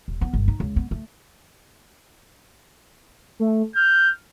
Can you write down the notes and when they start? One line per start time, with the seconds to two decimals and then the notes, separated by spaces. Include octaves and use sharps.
0.08 D#1
0.21 B3
0.33 G1
0.48 D#4
0.60 C#2
0.76 B3
0.91 A3
3.40 A3
3.76 F6 G6